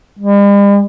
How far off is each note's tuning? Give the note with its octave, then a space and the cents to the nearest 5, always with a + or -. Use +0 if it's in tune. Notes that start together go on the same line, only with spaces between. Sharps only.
G3 +45